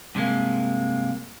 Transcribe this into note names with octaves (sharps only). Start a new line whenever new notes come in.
G2 C3 F3 G#3 A#3